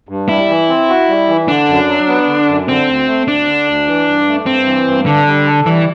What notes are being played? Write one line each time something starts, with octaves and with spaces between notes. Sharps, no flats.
G2
G3 E4
E3
C4
F#4
G3
E3
D3 D4
F#2
F#3
B3
D3
F#2
D3 C4
D2
A3
D2 D4
D3
D2
E3
G2
A3
G2 C4
E3
G2
D3 D4
G3
A4
E3 G3